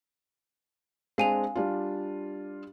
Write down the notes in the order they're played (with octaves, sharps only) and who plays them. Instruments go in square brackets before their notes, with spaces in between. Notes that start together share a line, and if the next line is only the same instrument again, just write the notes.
[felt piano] G#3 C4 D4 [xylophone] F5 G#5 F7
[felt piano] G3 D4 F4